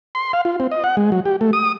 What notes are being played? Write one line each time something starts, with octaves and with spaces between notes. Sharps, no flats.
C6
F5
F4
C4
D#5
F#5
G#3
F#3
G4
A3
D#6